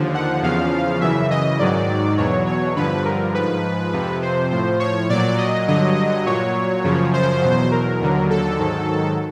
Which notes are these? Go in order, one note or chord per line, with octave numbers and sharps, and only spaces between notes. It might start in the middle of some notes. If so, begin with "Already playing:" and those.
Already playing: D#2 D3 F3
F#5
E2 C#3 F3 F5
F#2 C#3 E3 E5
D#5
G#2 D#3 F#3 D5
E2 B2 F#3 C#5
C#5
G2 D3 F3 B4
A#4
G#2 F3 B4
F2 C3 F3
C5
A2 F3 C5
C#5
A#2 F#3 D5
D#5
G2 D3 F#3 D#5
A#2 F#3 C#5
F#2 C#3 F3
C5
E2 B2 F#3
A#4
D#2 D3 F#3
A4
G#2 D#3 F#3